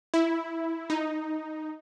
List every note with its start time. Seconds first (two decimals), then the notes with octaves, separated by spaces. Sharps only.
0.14 E4
0.90 D#4